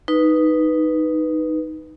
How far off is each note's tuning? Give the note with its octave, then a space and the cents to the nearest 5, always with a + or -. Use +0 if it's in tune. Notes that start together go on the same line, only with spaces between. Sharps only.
D#4 +0 B4 +0